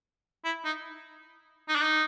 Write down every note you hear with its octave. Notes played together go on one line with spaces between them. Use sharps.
E4
D#4
D#4
D4
D#4